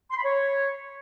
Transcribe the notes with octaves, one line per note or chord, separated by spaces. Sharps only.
C6
B5
C#5